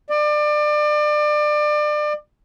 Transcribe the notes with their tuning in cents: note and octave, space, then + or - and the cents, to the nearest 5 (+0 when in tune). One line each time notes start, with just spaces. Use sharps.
D5 +30